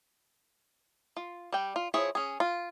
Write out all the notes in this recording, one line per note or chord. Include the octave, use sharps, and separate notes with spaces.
F4
G3 G5
F4
F3 E4 G#4 C#5
C#4 G#4
F4